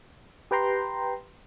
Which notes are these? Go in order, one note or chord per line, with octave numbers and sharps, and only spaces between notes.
G4 B4 G5 A#5 C6